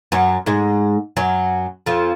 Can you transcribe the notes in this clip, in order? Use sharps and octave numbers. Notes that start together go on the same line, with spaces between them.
F#2 F#3
G#2 G#3
F#2 F#3
F2 F3